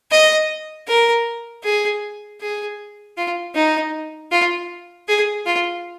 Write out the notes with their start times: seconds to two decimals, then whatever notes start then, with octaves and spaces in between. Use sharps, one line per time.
0.11 D#5
0.87 A#4
1.64 G#4
2.41 G#4
3.17 F4
3.55 D#4
4.31 F4
5.08 G#4
5.46 F4